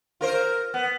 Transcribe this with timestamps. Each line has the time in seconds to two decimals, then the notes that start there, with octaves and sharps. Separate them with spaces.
0.21 F4 A#4 C5
0.74 B3